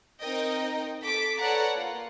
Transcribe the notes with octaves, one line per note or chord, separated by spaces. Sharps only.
C4 D#4 A#4 D#5 G5
A4 D6 B6
A4 B4 C#5 D5 F#5 A#5
A#3 F4